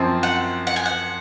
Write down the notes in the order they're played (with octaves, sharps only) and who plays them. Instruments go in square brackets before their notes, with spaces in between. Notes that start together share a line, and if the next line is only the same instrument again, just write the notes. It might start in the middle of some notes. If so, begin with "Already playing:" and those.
Already playing: [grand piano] F#2 F3 C4
[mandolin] F#5
F#5
G#5
F#5